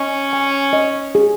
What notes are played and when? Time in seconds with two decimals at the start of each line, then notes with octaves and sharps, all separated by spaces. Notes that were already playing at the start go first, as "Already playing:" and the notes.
Already playing: C#4 D#5
0.33 G#5
0.73 D#5
1.15 G#4